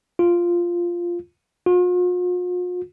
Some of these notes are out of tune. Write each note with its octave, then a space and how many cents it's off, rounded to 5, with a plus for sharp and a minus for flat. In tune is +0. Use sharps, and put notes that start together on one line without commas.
F4 -5
F4 +45